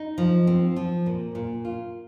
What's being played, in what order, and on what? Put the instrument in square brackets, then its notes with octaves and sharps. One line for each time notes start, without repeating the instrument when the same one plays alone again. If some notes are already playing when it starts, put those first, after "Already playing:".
Already playing: [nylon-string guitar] D#4
F3
C4
F3
A#2
A#2
F4